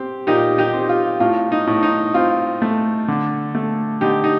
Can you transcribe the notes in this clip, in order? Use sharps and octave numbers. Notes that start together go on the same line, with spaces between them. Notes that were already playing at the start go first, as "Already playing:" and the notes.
Already playing: C4 G4
A#2 D#4 G4
D#4 G4
C4
F4
A2 F4
D#4
A2
D#4
C4 F4
A3
D3
A3
D3 D#4 G4
D#4